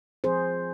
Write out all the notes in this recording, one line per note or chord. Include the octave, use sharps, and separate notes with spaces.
F3 C4 G#4 C5